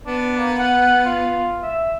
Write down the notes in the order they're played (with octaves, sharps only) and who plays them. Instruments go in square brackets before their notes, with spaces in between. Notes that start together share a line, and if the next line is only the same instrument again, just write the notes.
[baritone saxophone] B3 [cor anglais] D4
[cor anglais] A#3
F#5
F4
E5